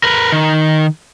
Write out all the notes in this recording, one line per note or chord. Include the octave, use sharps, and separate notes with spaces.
A#4 B4
D#3